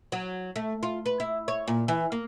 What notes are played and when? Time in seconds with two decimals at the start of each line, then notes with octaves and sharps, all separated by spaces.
0.12 F#3
0.56 A3
0.83 F4
1.06 B4
1.20 E4
1.48 C#5
1.67 A#2
1.88 E3
2.12 A#3